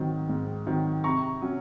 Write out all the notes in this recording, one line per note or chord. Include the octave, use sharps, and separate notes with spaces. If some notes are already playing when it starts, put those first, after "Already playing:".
Already playing: G#2 D#3 F#3 C4
G#2
D#3 F#3 C4
C3 A#5 C#6
F#3 C#4